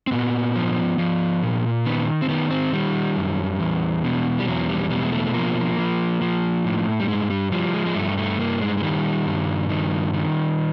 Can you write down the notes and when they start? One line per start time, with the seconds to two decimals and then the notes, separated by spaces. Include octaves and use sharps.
0.07 C4
0.12 A#2 B3
0.56 F3
0.98 F3
1.42 A#2
1.86 D#3 B3
2.22 C4
2.29 D#3 B3
2.51 C4
2.73 D#3 G3
3.16 F#2
3.60 E2
4.04 B2
4.39 G3
4.48 E2 F#3
4.68 G3
4.90 B2 G3
5.05 G#3
5.12 A3
5.34 F3 A#3
5.78 F3
6.21 F3
6.65 A2
7.00 G3
7.08 G2 G#3
7.30 G3
7.52 F3 G3
7.74 G#3
7.86 G#3
7.95 G2 A3
8.18 A3
8.39 G2 A#3
8.61 G#3
8.77 G#3
8.83 D#3 G3
9.26 G2
9.69 D#3
10.13 D#3